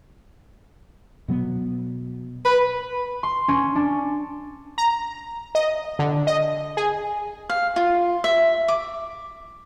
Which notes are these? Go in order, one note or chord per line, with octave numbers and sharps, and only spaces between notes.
B2 F#3 B3
B4
C6
C#4
D4
A#5
D#5
D3
D#5
G#4
F5
F4
E5
D6